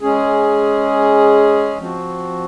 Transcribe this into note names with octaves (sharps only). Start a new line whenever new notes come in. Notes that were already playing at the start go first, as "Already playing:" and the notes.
G#3 C#4 G#4
F3 C4 F#4